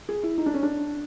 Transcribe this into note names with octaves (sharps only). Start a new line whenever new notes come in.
G#4
E4
D#4
D4
C#4
D4